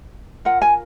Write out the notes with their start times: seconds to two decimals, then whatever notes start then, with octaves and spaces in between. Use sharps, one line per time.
0.45 F4 A#4 F#5
0.62 G#5